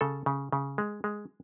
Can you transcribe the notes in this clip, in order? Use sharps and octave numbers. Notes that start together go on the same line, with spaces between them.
C#3 A4
C#3
C#3
G#3
G#3